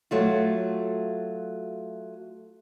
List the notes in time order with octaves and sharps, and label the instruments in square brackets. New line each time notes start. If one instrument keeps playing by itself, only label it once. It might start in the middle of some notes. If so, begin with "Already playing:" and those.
[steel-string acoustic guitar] F#3 A3 F4